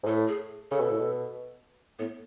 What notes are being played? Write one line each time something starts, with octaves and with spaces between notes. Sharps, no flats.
G#2
A2 A4
G#4
C#3 A4
B2
A2
B2
A2 B3